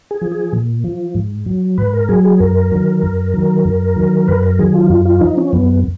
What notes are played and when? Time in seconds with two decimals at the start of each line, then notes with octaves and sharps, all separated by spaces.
0.11 G#4
0.21 F3
0.32 G#4
0.53 A#2
0.84 F3
1.15 G#2
1.46 F#3
1.78 G#2 B4
1.93 A#4
2.09 F#3 G#4
2.25 G#4
2.40 F#2 A#4
2.72 D#3 F#3
3.03 F#2
3.34 D#3 F#3
3.65 F#2
3.96 D#3 F#3
4.28 F#2 B4
4.43 A#4
4.59 D#3 F#3 G#4
4.74 F4
4.89 F#2 F4
5.05 F4
5.21 F3 D#4
5.37 C#4
5.53 F#2 B3